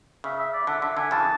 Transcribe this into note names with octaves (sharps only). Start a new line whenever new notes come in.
C#3 E5
E5
D5
D3 E5
D3 E5
D3 G#5
C#3 E3 A5